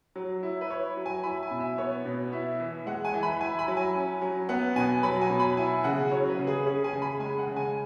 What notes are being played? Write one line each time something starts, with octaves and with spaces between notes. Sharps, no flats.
F#3
E4
B4
E4 C#5
F#3
G#5
E4 B5
G#5
B2
E5
B3 C#5
B2
E4 E5
E3
G#3 F#5
G#5
E3
B5
E4 G#5
B5
F#3
G#5
C#4
F#3
B3 F#5
B2 G#5
F#3 B5
G#5
B2
B5
E4 G#5
C#3 F#5
F#3 C#5
B4
C#3
G#4
C#4 G#4
G#5
C#3
B5
G#3 G#5
F#5
C#3
G#5